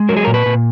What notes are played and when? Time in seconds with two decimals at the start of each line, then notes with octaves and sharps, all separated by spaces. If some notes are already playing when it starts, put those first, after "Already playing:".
Already playing: G#3
0.09 F#3 A#4
0.17 G#4
0.24 A#2 A#4
0.34 B4
0.46 A#2